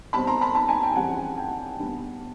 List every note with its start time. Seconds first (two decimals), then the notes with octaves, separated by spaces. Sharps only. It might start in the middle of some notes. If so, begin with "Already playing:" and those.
0.13 B2 G3 C4 A5 B5
0.27 A#5 C6
0.41 A5 B5
0.55 A5 B5
0.68 G#5 A#5
0.83 G5 A5
0.96 F2 C#3 E3 G3 C4 F#5 G#5
1.37 G5 A5
1.79 D2 D3 G3 B3